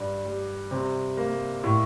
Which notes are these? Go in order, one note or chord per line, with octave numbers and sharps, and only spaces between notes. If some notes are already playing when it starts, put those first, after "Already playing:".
Already playing: G2
G3
C3
A#3
A2